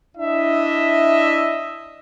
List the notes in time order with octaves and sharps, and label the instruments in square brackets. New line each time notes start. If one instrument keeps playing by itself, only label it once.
[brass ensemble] D4 E4 D#5 E5